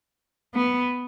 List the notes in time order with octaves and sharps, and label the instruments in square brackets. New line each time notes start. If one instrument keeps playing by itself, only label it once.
[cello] B3